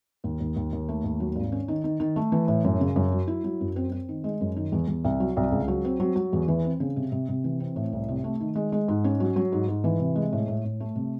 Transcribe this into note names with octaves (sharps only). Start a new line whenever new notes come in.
D#2
D#2
D#2
D#2
A3
D#2
F#3
G#1
C#4
D#3
D#3
D#3
A3
E3
A2
F#2
C#3
F#2
F#3
E4
F#3
F#2
C4
C4
D#3
G#3
F#2
D#3
E2
E2
C2
F#3
C2
C#2
F#3
C4
F#3
F#3
E2
E3
C4
C#3
C3
C3
C3
E3
C4
A2
C2
C3
A3
D#3
G#3
G#3
G#2
C#4
F#3
F#3
G#2
G#2
E3
C3
G#3
A2
A2
A2
A3
C3